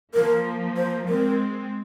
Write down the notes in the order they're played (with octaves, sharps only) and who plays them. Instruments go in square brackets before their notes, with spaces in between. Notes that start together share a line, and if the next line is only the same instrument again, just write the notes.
[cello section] F3 A#3 [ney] A#4
[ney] C5
[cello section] G#3 C4 [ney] A#4